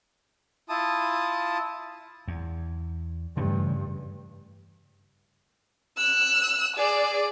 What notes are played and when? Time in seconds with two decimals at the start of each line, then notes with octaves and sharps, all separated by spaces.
0.69 E4 F4 A5 D#6
2.28 E2
3.37 G2 C#3 E3 A3
5.97 E6 F#6
6.76 G#4 D5